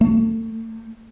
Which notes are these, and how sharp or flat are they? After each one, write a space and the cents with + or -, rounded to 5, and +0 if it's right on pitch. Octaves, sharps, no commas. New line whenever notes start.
A3 +35